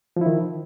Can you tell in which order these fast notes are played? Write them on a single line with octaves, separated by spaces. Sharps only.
F3 E4 D#3